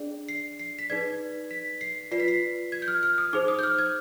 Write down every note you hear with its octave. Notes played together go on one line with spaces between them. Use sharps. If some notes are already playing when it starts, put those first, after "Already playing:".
Already playing: D4 G#4 D5
C7
C7
B6
D#4 G#4 B4 D5 G#6
B6
C7
F4 B4 D5 C7
B6
C7
G#6
G6
F6
F6
D#6
D#4 G#4 C5 D6
D#6
G6
F6
G#6